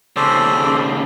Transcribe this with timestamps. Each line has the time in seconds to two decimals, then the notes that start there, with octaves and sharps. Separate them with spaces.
0.16 D#2 C#3 A4 C5 D5